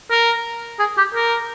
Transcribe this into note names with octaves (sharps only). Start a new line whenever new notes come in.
A#4
G#4
G4
A#4